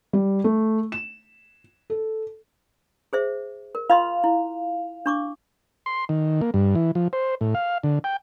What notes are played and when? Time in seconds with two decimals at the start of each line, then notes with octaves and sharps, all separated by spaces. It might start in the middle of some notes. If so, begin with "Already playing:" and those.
0.13 G3
0.44 A3
0.92 E7
1.90 A4
3.13 G#4 C5 E5
3.75 A#4
3.90 F4 D#5 F5 C6
4.24 E4
5.06 D4 C#6 D6
5.86 C6
6.09 D#3
6.41 A#3
6.54 G2
6.75 E3
6.95 F3
7.13 C5
7.41 A2
7.55 F5
7.83 D3
8.04 G5